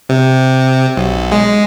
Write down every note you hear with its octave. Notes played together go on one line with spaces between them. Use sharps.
C3
B1
G#3